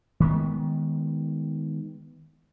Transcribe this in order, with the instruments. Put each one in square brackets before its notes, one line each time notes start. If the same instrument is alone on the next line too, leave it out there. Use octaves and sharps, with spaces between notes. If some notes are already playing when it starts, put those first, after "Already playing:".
[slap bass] D#3 G#3 B3